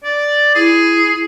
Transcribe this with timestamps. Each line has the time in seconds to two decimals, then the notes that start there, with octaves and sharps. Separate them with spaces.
0.04 D5
0.55 E4 G#4